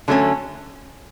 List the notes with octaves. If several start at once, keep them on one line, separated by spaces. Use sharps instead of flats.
D3 F#3 A3 C#4